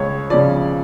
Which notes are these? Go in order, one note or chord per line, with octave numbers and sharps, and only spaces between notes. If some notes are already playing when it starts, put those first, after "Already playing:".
Already playing: C#2 C#5
C#3 F3 D5